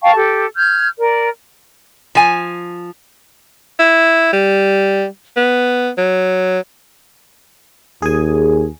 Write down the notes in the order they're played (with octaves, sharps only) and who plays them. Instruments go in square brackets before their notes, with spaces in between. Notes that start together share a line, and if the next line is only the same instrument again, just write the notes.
[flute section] F5 G5 A5 C#6
G4 A4
F6 G6 G#6
A#4 D5
[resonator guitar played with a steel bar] F3 G#5
[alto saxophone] E4
G3
B3
F#3
[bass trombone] D#2 [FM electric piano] G#4 G#5